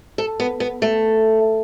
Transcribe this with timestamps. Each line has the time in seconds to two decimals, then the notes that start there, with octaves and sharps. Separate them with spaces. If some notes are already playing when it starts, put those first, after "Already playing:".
0.18 A4
0.40 B3
0.60 B3
0.82 A3